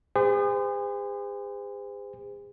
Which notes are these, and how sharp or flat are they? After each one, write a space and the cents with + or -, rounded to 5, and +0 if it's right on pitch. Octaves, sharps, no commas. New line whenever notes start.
G#4 -40 C5 -40